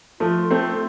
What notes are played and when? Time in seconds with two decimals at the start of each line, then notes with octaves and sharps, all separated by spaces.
0.20 F3 A3 F4
0.51 A3 C4